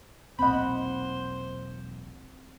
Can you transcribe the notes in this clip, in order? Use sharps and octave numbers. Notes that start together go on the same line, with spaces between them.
E1 B1 A#2 C4 C5 D#5 F#5 B5